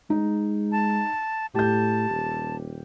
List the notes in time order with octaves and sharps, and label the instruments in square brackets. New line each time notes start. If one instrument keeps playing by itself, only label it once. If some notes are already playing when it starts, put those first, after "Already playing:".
[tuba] G#3 [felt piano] D#4
[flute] A5
[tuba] A2 [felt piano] G4 G6 [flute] A5
[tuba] D#1